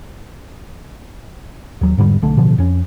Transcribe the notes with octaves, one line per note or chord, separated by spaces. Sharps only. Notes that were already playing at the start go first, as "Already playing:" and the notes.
D#2 F#3
E2 G#2 D3 G3
B1 D3 A3
A1 B2 D3 F3
F2 C#4